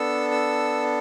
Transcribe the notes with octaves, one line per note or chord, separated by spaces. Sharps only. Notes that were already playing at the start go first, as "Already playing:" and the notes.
Already playing: B3 D4 A4 E6
E6